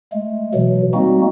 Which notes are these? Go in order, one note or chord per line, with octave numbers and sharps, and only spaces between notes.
G#3 A3
B2 E3 F#3
G3 G#3 A#3 C4 D#4 F#4